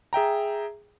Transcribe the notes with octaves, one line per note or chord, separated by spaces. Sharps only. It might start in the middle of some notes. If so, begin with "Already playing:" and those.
G#4 E5 G5 A#5